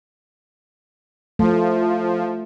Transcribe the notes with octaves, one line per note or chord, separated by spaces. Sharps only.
F3 A3